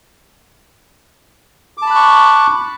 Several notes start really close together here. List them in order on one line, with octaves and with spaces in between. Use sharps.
D6 A5 B5 F#6 C#6